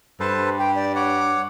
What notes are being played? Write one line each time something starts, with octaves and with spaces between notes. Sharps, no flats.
G2 A4 B4 C5 A5
G4 G5
D5
C#5 F#5 D6